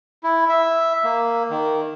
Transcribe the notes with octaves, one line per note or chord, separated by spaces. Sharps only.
E4
E5
A#3
D#3